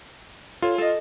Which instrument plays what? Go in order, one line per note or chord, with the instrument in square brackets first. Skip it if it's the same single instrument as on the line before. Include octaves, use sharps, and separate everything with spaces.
[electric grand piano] F4 [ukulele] A4 C#5
[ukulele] A4 D#5